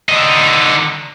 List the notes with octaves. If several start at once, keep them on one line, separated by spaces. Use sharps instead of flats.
D3 D#4